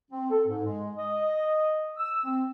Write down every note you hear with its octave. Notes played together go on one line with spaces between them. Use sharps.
C4
A4
G#2
G#3
D#5
E6
C4